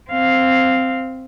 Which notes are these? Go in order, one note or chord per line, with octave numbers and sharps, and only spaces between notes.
C4 F5